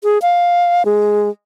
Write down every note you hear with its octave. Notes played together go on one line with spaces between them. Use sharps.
G#4
F5
G#3